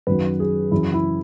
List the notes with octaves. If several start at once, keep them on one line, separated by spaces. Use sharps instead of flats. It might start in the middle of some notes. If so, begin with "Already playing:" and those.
F#2 D#3 F#3 B4
G#4
F#2 C#3 E3 E4
E4